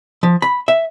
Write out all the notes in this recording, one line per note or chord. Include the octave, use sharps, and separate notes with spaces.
F3
B5
E5